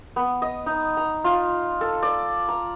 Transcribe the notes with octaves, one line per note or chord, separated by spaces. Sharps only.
B3
D#5
D#4
A#5
F4
A4
D5
A#5